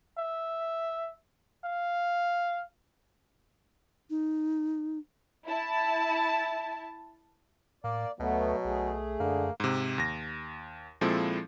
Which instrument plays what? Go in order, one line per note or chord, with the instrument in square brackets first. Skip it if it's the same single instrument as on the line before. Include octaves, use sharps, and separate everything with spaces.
[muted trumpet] E5
F5
[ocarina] D#4
[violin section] E4 A5
[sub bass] A2 [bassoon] A#3 [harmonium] D5
[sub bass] D2 [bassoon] B2 [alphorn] F#3 [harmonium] A3 B3
[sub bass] B1 [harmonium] A3 G#4
[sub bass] F#2 [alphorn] D3 [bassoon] A#3
[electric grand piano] G#2 C3
D#2 A#6
A#2 F3 G#3 C4 E4 A4